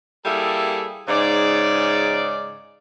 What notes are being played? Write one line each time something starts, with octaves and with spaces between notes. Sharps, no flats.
G3 A#3 E4 G#4 A4
G#2 C#3 D#4 D5